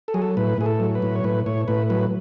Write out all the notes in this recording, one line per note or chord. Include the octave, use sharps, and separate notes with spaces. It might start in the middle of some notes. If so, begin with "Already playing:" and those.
A4
F#3 G#4
A4
A2 B4
A2 G#4
A4
F#3
B4
A2
C#5
A2 B4
A2 C#5
A2 B4
F#3 B4